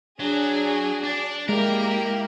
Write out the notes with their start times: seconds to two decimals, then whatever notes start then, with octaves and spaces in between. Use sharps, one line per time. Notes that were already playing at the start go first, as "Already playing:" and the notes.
0.20 F#3 D4 G#4
1.04 D4 D5
1.49 G#3 A#3 E4 G4 A#4